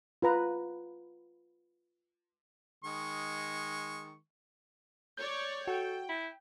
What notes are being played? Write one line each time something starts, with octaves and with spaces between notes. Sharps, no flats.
F4 B4 A#5
D#3 G#3 C#6
C#5 D5 G6
F#4 A4 G5
E4